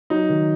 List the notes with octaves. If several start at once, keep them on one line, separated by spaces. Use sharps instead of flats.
F#3 D#4
D#3